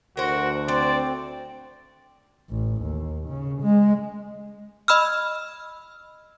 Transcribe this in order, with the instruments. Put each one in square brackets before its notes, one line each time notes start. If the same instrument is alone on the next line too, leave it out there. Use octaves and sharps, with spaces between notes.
[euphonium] D2 [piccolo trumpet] F#4 [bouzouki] A#4 C5
[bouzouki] C4 [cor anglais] C5 [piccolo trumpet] D5
[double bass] A1
D#2
C#3
G#3
[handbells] D#5 B5 E6 F6